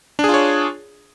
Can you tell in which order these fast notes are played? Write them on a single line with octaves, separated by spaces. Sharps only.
D4 G#4 F4 C#5